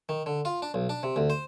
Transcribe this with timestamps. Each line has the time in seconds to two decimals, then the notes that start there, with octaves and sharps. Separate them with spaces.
0.09 D#3
0.26 D3
0.45 F4
0.62 D4
0.74 B1
0.89 D4
1.03 C3
1.16 D2
1.30 C5